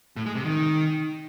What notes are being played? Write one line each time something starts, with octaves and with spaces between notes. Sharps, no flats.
A2
G#3
C3
D#3